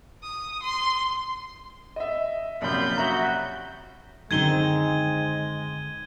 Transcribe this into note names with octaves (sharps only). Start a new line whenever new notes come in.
D#6
C6
D#5 E5
A#1 F#2 C3 F4 B5 G6
F#4 E5 A#5
F#2 D3 D#3 G#3 C4 G#6 D#7 G7